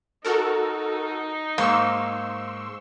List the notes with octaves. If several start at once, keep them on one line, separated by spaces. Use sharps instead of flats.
D#4 F#4 A4 A#4
G#2 A#3 C6 C#6 E6